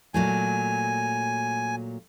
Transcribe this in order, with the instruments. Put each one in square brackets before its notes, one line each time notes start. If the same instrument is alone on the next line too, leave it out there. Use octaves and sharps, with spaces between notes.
[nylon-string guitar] A#2 F#3 A3 [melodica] G#5